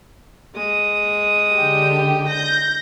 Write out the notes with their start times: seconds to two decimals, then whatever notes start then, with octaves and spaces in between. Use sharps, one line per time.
0.55 G#3 D#6
1.54 D3 G4 G5
2.28 G6 A#6